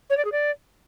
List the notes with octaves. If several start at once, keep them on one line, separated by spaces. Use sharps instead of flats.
C#5
D5
G#4
D5